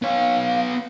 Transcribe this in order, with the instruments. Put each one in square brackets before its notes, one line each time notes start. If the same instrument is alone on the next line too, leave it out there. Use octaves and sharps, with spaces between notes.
[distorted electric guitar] B3 C#5 [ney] F5